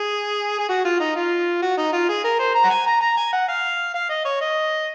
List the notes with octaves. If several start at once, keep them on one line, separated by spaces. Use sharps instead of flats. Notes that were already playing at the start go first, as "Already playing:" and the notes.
Already playing: G#4
G#4
F#4
F4
D#4
F4
F#4
D#4
F4
G#4
A#4
C5
A#5
F#5
G#5
A#5
A#5
G#5
F#5
F5
F5
D#5
C#5
D#5